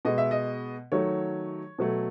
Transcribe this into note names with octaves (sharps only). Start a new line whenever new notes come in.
B2 G#3 D#5
E5
D#5
D#3 F#3 A3 C#5
B2 F#3 A3